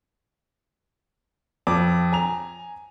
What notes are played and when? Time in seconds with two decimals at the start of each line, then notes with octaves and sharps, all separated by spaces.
1.67 F2 D6
2.12 G#5 A#5 F7